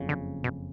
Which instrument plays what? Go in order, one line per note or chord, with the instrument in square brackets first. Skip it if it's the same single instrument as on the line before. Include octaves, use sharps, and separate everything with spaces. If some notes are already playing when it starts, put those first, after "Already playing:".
Already playing: [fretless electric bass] F#1 F2 C#3
[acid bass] D3
B2